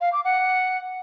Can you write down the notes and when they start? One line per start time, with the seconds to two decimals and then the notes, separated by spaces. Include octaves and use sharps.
0.01 F5
0.13 D6
0.25 F#5